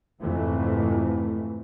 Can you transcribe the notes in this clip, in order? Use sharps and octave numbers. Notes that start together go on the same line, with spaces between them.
F2 G#2 C3 E3 A3